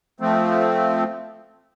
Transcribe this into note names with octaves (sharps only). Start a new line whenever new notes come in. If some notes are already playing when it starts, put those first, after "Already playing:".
F3 A3 C4